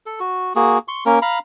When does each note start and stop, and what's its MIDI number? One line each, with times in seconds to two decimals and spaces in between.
0.06 0.20 69
0.20 0.53 66
0.56 0.78 58
0.56 0.78 66
0.56 0.78 68
0.88 1.04 84
0.88 1.04 85
1.06 1.19 58
1.06 1.19 61
1.06 1.19 70
1.22 1.39 77
1.22 1.39 82
1.22 1.39 83